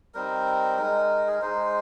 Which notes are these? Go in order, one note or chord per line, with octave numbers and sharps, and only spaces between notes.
G3 C4 D#4 A#4
G#3 D#4
G#4
A#4
G#3 D#4 C5